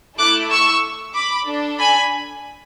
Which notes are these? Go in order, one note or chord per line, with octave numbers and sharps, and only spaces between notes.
A3 E4 A4 D6 F#6
C#6 E6
B5 D6
D4 A4
G#5 B5